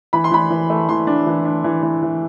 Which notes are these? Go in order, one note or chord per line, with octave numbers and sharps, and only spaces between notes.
E3 B5
C6
E3 B5
E3
A3
E3 C6
D4
E3
D4
E3
E3
E3